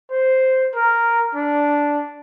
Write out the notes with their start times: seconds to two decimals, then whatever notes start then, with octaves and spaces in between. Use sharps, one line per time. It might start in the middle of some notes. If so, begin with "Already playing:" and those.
0.11 C5
0.75 A#4
1.35 D4